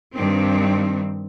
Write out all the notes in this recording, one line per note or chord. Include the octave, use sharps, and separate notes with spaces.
G2 D#3 C4